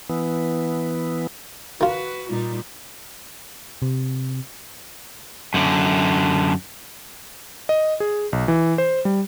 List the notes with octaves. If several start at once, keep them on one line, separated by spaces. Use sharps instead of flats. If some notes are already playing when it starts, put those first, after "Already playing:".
E3 B3
D#3 F4 F#4 B4
A#2 G3 D#4
C3
F#2 D3
D#5
G#4
B1
E3
C5
G3